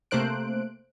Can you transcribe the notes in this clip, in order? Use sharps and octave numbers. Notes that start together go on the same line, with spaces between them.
C3 A3 A#3 C5 F#6 D7